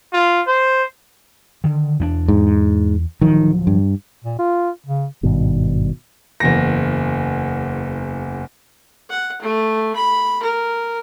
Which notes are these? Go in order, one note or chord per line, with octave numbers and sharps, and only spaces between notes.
F4
C5
D3 D#3
E2 B3 D4
G#2
D1 D#3 F3 F#3
G2
A#2
F4
C#3
G#1 G2 B2 D#3
F#1 E2 A#6
F#5
A3
B5
A#4